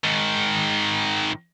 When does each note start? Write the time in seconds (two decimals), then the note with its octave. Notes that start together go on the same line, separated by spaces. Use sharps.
0.04 G#2 D#3